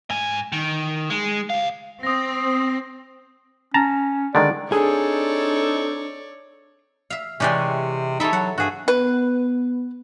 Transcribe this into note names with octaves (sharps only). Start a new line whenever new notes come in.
G#2 G#5
D#3
G#3
C#2 F5
C4 D#6 A#6
C#4 A5 A#5
D3 D#3 G#3 D5
C4 D4 D#4 G#4 A4 C#5 D5
E5 F5
C3 E3 G#3 C#4 G4 D5 G5
D#4 E4 A4 C#5 E5
F#3 F#5
G2 F#4 G#4
B3 B4